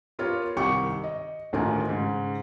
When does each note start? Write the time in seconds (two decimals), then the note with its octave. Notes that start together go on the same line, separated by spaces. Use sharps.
0.19 B3 F4 G4 A#4 C#5
0.57 C2 D#3 G5 C#6 D6 C#7
1.04 D#5
1.53 A1 D2 D#3 F4 G#5 A#5
1.89 G#2 C#3